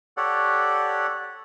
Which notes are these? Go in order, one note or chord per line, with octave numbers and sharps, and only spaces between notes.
G4 A4 C#5 D5 F#5